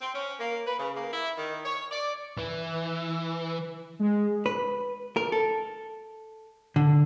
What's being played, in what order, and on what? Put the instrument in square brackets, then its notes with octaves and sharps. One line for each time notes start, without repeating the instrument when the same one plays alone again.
[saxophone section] C4
C#4
A#3
B4
C#3
A#3
E4
D#3
C#5
D5
[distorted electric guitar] E3
[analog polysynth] G#3
[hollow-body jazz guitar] B4
A#4
A4
D3